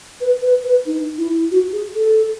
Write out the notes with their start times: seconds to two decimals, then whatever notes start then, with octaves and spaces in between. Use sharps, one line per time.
0.21 B4
0.42 B4
0.64 B4
0.86 D#4
1.18 E4
1.51 F#4
1.72 G#4
1.95 A4